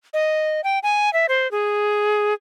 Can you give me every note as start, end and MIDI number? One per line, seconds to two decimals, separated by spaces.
0.14 0.61 75
0.64 0.79 79
0.83 1.12 80
1.13 1.26 76
1.29 1.50 72
1.51 2.34 68